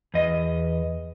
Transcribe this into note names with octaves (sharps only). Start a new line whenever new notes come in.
E2 D#5